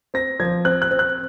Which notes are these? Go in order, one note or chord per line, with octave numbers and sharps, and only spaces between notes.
C4 A#6
F3 G#6
C4 F#6
F#6
C4
F#6